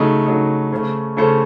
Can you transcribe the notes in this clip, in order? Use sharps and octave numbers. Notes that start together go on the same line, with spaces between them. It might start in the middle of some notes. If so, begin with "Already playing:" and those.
Already playing: C#3 F#3 A3 D#4
C#3 F#3 A3 D#4
C#3 A3 C#4 A4 C5
C#3 A3 C#4 A4 C5